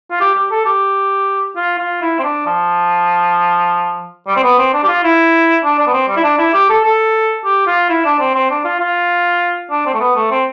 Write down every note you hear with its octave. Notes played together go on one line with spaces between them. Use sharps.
F4
G4
G4
A4
G4
F4
F4
E4
C4
D4
F3
G3
C4
B3
C4
D4
G4
F4
E4
D4
D4
B3
C4
G3
E4
D4
E4
G4
A4
A4
G4
F4
E4
D4
C4
C4
D4
F4
F4
D4
C4
A3
B3
A3
C4